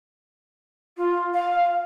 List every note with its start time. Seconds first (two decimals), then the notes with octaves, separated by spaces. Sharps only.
0.97 F4
1.33 F5